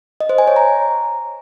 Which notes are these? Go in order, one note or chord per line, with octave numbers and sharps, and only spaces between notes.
D#5
C5
G#5
C#5
A#5